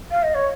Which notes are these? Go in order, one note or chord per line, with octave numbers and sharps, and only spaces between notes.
F5
D#5
C#5